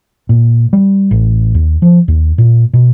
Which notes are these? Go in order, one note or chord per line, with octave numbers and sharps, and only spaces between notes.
A#2
G3
A1
D#2
F3
D#2
A#2
B2